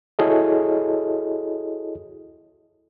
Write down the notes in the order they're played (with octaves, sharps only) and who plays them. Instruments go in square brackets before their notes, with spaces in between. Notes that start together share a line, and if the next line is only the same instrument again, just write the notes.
[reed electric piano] E4 F#4 G#4 A4 C#5 D#5